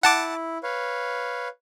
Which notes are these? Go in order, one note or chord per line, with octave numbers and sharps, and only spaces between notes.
E4 F#5 A5 D6
B4 C#5 F5